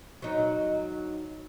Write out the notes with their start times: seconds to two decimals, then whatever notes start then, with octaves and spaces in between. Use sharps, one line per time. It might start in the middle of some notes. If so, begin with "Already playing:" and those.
0.22 F#3 D#4